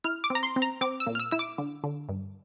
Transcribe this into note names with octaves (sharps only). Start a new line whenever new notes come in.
E4 F6
D6
C4
A#5
C6
C4
A#5
C4 D6
E6
A#2
F6
E6
E4 E6
D6
D3
D3
G2